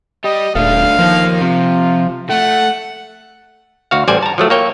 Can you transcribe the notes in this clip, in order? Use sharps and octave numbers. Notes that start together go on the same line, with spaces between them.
G3 G4 D#5
D#1 A3 D4 F5
D#3 F3 A#3
C3 F4
A3 F#5
D2 F#4 F5
A1 G3 C5 D5 G#5
A5 A#5
F3 F#3 A3
A#3 C#5 G5